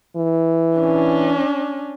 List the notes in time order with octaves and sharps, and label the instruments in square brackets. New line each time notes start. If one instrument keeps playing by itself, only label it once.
[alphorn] E3
[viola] C#4 D4